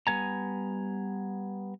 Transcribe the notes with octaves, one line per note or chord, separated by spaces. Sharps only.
G3 B3 G#5 A#5